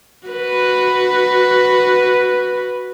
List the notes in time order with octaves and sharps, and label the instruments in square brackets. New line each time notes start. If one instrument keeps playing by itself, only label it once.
[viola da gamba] F#4 B4